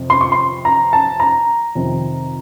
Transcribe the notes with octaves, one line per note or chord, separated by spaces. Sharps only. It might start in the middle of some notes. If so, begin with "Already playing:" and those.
Already playing: F2 C3
C6
C#6
C6
A#5
A5
A#5
F2 C3 D#3